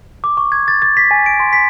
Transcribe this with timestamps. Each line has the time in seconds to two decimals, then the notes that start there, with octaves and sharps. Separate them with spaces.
0.24 D6
0.37 C#6
0.52 G#6
0.68 A6
0.82 A6
0.97 B6
1.11 G#5
1.26 D7
1.40 C6
1.53 B6